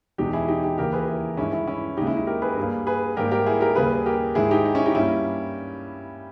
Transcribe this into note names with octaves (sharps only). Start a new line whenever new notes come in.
E2 B2 G#3 D#4 G4
E4 G#4
D#4 G4
D#4 G4
D#2 C#3 E3 G4 A#4
G#4 B4
E4 G#4
G2 D#3 G#3 C#4 E4
C#4 E4
C#4 E4
D#2 C#3 G#3 D#4 G4
C#4 E4
D#4
G4 A#4
G#4 B4
G2 G3 A#3
G#4 B4
G#2 D#3 G3 A#3 G4 A#4
G4 A#4
E4 G#4
G4 A#4
D#2 C#3 G3 G#4 B4
G4 A#4
G#2 D#3 G#3 E4 G#4
D#4 G4
D#4
C#4 E4
D#4 G4
G2 G3 A#3 C#4 E4